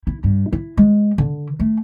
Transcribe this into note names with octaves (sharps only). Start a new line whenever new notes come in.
E4
G2
E4
G#3
D3
A3